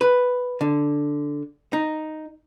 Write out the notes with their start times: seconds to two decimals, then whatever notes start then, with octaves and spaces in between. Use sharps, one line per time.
0.01 B4
0.61 D3
1.73 D#4